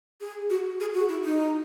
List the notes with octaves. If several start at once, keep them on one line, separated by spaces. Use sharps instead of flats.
G#4
F#4
G#4
F#4
E4
D#4